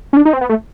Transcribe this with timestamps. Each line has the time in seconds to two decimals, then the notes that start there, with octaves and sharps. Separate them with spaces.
0.13 C#4
0.17 D4
0.25 D#4
0.33 C4
0.41 B3
0.49 A3